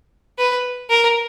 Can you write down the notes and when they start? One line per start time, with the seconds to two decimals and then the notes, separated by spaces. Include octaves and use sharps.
0.38 B4
0.90 A#4